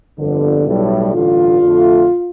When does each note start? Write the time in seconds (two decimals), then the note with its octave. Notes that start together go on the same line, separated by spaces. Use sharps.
0.18 G1 F2 D3
0.66 B1 A2 G3
1.13 A1 G2 D3 F4
1.61 F2 D3 A3